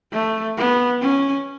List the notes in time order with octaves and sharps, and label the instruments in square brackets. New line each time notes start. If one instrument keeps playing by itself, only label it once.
[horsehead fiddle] A3
B3
C#4